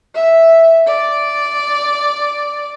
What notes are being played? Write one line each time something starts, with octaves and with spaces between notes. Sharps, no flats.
E5
D5